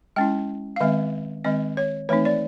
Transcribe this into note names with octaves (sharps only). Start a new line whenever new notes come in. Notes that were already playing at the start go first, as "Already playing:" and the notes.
G#3 C#4 E4 G5
F5
D#3 G#3 C4 E5
D#3 G#3 C4 D#5
C#5
E3 A3 C4 D#4 C#5
D5